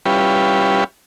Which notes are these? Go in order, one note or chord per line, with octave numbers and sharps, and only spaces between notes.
G3 C#4 E4 F4 G4 B4